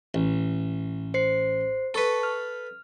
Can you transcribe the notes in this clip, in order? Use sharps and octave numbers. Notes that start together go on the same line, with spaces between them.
A1
C5 C7
A4 B4 A5 C#6
F6